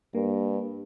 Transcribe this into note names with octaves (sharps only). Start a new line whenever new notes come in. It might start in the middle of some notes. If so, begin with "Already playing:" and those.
G2 A#3